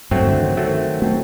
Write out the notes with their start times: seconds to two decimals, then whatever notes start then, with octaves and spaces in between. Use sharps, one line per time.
0.11 G2 F#3 A3 C4
0.26 D3
0.42 D#3
0.57 F#3 A3 C4
1.02 F#3 A3 C4 D#4 A4